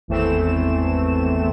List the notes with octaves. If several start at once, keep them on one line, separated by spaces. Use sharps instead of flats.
G#1 E2 E3 A3 C4 E7